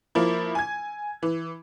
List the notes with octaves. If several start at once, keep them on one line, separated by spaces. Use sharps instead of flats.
F3 A#3 E4
G#5 G#6
E3